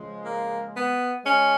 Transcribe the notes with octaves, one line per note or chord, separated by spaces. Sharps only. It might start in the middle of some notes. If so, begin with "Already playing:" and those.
Already playing: C#3 F3 G#3
A#3
B3
G#3 C#4